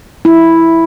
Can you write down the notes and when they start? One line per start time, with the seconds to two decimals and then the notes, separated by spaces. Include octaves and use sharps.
0.25 E4